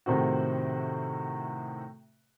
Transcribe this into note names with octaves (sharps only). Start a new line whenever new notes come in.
A2 C3 D#3 C4 F#4